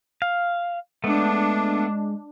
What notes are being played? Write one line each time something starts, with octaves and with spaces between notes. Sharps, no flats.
F5
G#3 A3 B3 D4